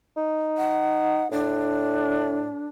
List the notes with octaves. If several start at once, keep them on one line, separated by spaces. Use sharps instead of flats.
D#4
F#5
A2 D4